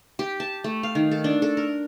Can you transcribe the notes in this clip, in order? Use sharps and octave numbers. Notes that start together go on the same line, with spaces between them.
G4
A5
A3
F5
D#3
A4
D4
A4
A#4